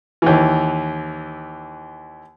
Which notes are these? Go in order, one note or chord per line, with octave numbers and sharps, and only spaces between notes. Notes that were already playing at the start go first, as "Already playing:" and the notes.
D#2 E3